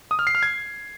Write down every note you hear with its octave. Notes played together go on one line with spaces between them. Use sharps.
D#6
F6
C7
F6
G#6